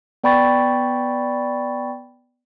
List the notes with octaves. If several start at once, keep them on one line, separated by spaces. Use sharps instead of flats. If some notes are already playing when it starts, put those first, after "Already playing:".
B3 D5 G5 B5 C#6 A6